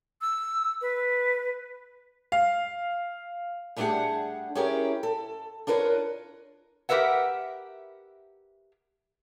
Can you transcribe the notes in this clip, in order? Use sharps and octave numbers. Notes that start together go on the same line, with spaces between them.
E6
B4
F5
G3 A3 D4 G4 G#4 F#5
C#4 E4 G4 G#4 A#4
A4
D4 F4 A#4 B4 C#5
G4 A#4 B4 E5 F#5